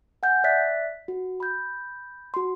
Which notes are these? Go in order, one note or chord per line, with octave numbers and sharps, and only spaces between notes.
F#5 G#5 G6
D5 E5 F#6 A6 B6
F#4
B5 G6
F#4 C6